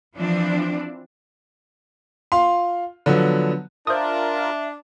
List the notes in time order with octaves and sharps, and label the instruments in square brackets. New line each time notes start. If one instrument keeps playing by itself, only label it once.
[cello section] E3 F3 C4 D4
[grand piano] F4 F5 C6
D3 F3 F#3 B3
[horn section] D4 [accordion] F4 A#4 [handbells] C5 D#6 [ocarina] E5